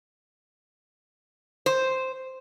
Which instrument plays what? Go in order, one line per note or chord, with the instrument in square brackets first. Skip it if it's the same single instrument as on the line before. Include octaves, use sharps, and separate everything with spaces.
[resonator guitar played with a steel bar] C5